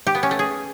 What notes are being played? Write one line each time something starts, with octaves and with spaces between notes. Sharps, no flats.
G4
B3
C#4
A3
G#4